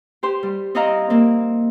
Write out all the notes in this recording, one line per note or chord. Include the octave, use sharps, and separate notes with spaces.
G4 C5 C6
G3
C4 D#4 E4 D#5 F5 A#5
A#3 C4